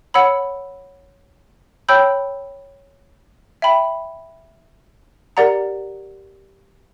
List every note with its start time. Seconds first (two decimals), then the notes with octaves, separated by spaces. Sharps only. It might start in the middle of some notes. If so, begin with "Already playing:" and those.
0.14 C#5 F#5 B5 E6
1.89 C#5 G5 B5 E6 G6
3.62 E5 G5 B5
5.37 G4 A#4 D5 F#5 A#5